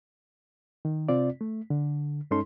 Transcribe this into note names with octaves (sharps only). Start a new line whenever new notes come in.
D#3
C3 C4 F4 D5
A3
D3
G2 G#3 C#4 D#4 A4 C6